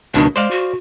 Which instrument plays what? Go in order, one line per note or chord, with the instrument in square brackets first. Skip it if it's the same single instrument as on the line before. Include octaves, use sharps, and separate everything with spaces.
[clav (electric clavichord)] C#2 B2 D#3 [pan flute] D4
[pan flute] G#3 [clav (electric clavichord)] C5 D5 F5
[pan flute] F#4